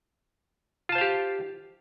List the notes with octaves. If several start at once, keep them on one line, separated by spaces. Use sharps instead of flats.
F4 G4 C5 F5 A5